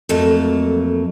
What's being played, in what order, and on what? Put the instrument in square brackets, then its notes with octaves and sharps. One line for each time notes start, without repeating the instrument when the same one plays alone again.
[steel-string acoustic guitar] F2 F#3 A3 A#3 A5